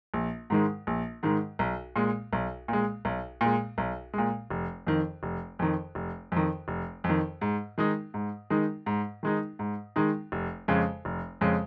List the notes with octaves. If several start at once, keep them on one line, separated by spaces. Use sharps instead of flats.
A#1
G#2 D#3 G#3
A#1
G#2 D#3 G#3
B1
A#2 G#3
B1
A#2 G#3
B1
A#2 G#3
B1
A#2 G#3
F1
F2 D#3
F1
F2 D#3
F1
F2 D#3
F1
F2
D#3
G#2
D#3 G#3 D#4
G#2
D#3 G#3 D#4
G#2
D#3 G#3 D#4
G#2
D#3 G#3 D#4
F1
F2 C#3 G#3
F1
F2 C#3 G#3